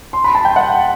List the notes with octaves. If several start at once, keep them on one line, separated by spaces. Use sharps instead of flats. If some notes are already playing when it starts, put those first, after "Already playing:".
C6
B5
A5
G5
F#5